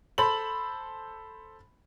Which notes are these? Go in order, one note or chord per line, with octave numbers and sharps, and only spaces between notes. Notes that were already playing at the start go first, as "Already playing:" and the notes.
A4 C5 B5 F#7